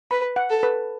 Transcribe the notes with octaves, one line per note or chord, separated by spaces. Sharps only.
B4 B5
F#5
A4
B4